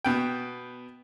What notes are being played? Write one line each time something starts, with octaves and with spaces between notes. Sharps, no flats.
B2 B3 G5